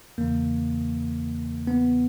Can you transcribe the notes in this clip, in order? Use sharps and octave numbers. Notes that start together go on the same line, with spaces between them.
E2 C#3 E3 A#3
B3